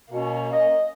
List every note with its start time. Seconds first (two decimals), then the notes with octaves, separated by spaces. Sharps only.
0.12 B2 A#3 C#4
0.53 D#5